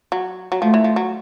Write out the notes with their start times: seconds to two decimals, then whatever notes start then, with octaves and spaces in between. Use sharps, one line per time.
0.12 F#3
0.52 F#3
0.62 F3 A3
0.74 E3
0.84 F3
0.96 F#3